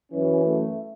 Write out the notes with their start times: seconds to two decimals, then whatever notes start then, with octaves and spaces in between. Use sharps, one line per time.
0.12 F#2 E3 C#4
0.43 A3